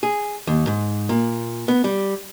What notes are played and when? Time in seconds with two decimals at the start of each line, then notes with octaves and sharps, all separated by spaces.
0.03 G#4
0.47 D#2
0.67 G#2
1.09 A#2
1.68 B3
1.84 G3